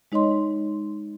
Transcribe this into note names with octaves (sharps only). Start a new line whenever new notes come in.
G#3 D#4 C#5 D#5 C6